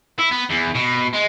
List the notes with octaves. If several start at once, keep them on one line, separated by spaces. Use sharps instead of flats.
E4
B3
E2
B2
G#3